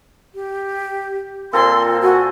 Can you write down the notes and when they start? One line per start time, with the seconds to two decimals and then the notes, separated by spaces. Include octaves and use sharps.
0.35 G4
1.53 A#2 A#3 C4 F4 A4 C6
2.02 F#4 G#5